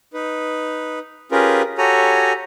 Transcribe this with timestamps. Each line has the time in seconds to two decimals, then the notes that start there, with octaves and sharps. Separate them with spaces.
0.14 D#4 B4
1.32 C#4 F4 G4 G#4 A#4 B4
1.78 F#4 G4 A4 C#5 G#5 A#5